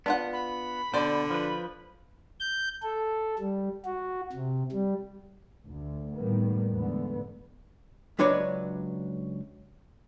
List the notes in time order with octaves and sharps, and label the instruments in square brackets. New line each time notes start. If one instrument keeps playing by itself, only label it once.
[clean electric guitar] B3 [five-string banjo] D4 F4 F#5
[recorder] B5
[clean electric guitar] B2 [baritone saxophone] D3 [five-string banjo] C5 D5
[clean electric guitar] F3 B4
[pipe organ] G6
A4
G3
F#4
C3
G3
[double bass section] D2
A2 D#3 G3 A#3 B3
E2 G#2 D3 A3 B3
[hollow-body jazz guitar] C#2 F#3 D4 B4 C#5 D5